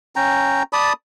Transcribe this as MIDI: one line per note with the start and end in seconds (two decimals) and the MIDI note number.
0.16 0.63 61
0.16 0.63 79
0.16 0.63 82
0.73 0.93 74
0.73 0.93 81
0.73 0.93 83
0.73 0.93 87